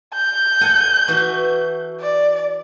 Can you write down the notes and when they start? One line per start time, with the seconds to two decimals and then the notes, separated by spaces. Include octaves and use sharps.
0.14 G6
0.61 A4 F#5 G#5
1.08 E3 F#4
2.01 D5